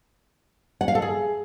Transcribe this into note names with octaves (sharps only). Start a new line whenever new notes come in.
F#5
F5
A4
G#4